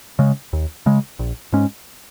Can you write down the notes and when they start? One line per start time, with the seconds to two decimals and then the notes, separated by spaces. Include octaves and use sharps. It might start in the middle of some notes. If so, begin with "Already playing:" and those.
0.19 C#3 G#3
0.53 D#2
0.86 C#3 G#3
1.19 A#1
1.53 G#2 G#3 C#4